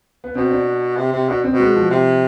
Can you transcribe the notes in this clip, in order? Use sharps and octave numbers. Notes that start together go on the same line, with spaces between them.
B3
B2 C4
D4
C3
C3
B2 D4
C4
B2
G#3
F3
C3